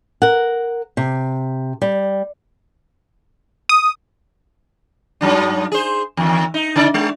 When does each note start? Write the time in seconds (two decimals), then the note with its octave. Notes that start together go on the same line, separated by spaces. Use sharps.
0.22 A#4 F#5
0.97 C3
1.82 G3
3.69 D#6
5.21 G2 F#3 D4
5.72 G#4 C5
6.17 E2 D#3
6.54 D#4
6.76 C#3 D#4 D5
6.94 G#3